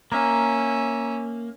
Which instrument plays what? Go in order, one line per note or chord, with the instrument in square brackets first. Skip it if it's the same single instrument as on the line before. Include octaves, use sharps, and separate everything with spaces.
[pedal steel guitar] A#3 [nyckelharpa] C#4 E5 [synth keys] A#5